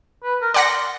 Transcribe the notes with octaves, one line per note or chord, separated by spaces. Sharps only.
B4
A#4
D5 F#5 C6 A#6